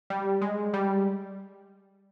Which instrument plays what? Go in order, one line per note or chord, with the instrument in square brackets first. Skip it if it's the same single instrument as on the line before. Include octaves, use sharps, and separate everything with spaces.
[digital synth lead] G3
G#3
G3